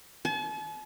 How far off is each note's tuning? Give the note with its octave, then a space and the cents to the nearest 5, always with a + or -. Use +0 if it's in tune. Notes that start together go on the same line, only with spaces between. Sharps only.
A5 -45